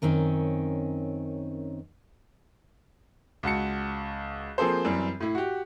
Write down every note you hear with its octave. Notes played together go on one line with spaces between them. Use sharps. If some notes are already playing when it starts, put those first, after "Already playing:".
F#2 D#3 C4 C#4
C#2 F#4 A5 C#7
F3 A#3 C4 G#4 A4 C5
F#2 E3 G3 C4
A2 E4
F#4 G4